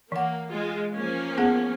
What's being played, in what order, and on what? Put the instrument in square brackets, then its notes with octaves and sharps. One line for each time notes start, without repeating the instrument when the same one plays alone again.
[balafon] E3 F#5 [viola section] A#3
[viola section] G#3 F4
F3 A#3 C#4
[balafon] B3 G#4 F#5